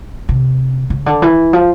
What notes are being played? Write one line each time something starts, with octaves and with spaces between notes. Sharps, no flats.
C3
C#3
D3
E3
F3